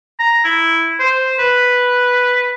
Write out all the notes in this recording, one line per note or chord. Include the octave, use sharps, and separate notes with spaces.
A#5
E4
C5
B4